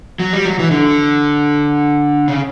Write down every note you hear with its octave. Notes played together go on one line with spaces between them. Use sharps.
F#3
G3
F#3
E3
D3
C#3